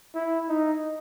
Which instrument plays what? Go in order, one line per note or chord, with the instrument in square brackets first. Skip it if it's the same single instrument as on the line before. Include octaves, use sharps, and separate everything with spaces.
[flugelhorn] E4
D#4